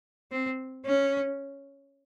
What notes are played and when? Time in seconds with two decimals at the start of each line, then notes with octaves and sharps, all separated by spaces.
0.31 C4
0.86 C#4